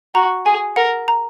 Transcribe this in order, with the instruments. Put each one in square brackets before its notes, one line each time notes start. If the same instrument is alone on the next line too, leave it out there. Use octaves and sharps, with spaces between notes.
[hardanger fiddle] F#4 [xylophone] A#5
[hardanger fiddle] G#4 [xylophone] G#5
[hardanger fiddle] A#4 [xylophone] F#5
[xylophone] A#5